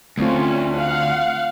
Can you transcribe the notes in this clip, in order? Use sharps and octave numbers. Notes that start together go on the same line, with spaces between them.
D2 A3 C4 C#4 F4
F5 F#5